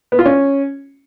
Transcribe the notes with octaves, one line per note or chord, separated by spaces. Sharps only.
B3
F4
C#4